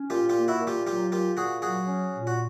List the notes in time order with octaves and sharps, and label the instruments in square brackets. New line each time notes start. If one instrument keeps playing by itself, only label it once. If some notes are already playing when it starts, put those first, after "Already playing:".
Already playing: [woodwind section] C#4
[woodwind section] A#2 [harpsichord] F4 G4
[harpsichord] F4 G4
[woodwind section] A#3
[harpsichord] E4 F#4
[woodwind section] A#2
[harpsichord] F4 G4
[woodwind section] F#3 [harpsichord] F4 G4
[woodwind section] A#2 [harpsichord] F4 G4
[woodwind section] A#2 [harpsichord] F#4 G#4
[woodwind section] F#3 [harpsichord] F#4 G#4
[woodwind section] C#4
A#2
[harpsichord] F#4